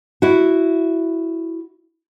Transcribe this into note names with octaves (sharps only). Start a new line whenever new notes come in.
E4 F#4